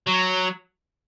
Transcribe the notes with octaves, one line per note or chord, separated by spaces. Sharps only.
F#3